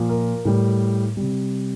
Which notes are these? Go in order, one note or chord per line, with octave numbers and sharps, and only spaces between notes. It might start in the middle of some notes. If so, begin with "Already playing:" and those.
Already playing: A#2 F3
A#4
A2 G3
C3 G3